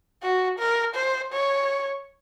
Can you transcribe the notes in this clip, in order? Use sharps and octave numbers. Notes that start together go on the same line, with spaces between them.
F#4
A#4
C5
C#5